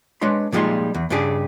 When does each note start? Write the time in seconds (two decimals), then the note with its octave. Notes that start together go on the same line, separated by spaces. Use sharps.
0.21 G#3 D4 B4 C#5 C6
0.52 A#2 F3 G3 G#3 D#4 C6
0.95 E2
1.10 G2 C#3 D4 G4 G#4